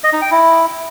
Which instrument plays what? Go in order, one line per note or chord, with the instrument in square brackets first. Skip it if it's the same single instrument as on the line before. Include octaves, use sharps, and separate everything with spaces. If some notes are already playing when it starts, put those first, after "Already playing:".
[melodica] D#5
D#4
G5
E4